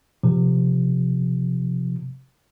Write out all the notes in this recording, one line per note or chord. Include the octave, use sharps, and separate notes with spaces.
C3 F3